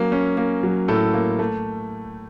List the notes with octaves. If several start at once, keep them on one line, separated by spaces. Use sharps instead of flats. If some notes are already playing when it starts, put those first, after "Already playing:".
Already playing: F#3 A#3 C#4
C#4
A#3
F#3
A2 A4
A#3
A3